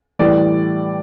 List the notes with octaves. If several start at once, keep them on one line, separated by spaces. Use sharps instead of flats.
A2 E3 G3 D5